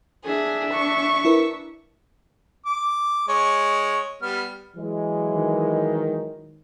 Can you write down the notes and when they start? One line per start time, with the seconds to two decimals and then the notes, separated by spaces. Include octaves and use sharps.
0.25 D4 G#4 E5
0.73 C#6
1.25 E4 A#4 B4
2.66 D6
3.28 G#3 C#5
4.22 G3 B3 F6
4.77 E3 F#3 G#3
5.34 D#3